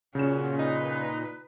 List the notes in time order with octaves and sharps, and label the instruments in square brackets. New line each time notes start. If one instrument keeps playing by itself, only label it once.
[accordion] A#2 [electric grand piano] C#3 E7 [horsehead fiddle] C#4 F#4
[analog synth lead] D#4 [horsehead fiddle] B4